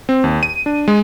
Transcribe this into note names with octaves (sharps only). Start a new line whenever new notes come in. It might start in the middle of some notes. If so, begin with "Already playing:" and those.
C4
D#2
D#7
D4
G#3